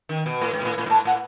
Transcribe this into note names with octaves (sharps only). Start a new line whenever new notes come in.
D#3
B2
A2
G#2
B2
A2
A2
G#2
A2 A5
A2 F#5